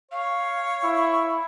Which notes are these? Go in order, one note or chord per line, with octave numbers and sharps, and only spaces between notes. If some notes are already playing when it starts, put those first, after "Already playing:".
C#5 F5
E4